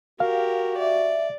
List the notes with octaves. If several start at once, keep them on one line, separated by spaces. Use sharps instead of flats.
F#4 G4 A#4 F5
D5 E5